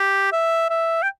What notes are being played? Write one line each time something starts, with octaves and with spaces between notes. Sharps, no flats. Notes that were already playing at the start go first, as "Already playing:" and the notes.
Already playing: G4
E5
E5
G5